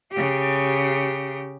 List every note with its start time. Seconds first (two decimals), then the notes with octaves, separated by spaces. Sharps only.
0.12 C#3 G4